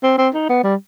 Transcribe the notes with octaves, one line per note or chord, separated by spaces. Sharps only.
C4
C4
D#4
B3
G3